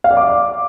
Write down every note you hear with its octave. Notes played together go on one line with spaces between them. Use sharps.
F5
D5
D6